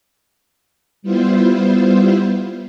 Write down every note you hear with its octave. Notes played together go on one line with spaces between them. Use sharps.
G3 B3 E4 F4 C5